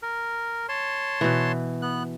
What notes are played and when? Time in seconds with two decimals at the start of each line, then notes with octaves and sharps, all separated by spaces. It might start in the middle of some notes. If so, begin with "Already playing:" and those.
0.03 A#4
0.69 C#5 A5 C6
1.21 B2 E3
1.82 B3 F#6